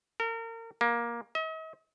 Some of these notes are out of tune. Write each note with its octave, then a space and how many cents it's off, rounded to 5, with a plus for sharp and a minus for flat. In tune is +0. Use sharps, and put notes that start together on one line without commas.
A#4 -35
A#3 +15
D#5 +45